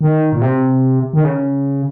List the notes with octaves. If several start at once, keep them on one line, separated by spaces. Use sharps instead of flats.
D#3
A#2
C3
D#3
C#3